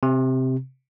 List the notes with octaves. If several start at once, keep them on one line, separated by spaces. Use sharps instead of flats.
C3